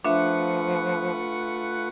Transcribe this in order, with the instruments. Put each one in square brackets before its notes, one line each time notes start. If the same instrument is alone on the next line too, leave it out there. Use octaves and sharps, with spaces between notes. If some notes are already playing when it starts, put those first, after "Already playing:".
[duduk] F3 [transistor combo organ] A3 F4 [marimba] D4 E5 [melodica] B4 F#5 C#6